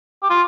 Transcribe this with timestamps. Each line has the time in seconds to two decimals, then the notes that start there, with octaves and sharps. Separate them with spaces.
0.23 G4
0.30 F4